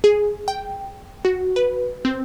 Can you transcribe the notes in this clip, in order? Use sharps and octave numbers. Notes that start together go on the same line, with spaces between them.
G#4
G5
F#4
B4
C4